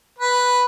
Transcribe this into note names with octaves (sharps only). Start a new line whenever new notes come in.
B4